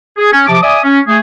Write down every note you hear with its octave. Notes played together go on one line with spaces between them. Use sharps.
G#4
C#4
C3 F3 A5 D6
D5 E5 G#5 D6 D#6
C#4
A3 G#4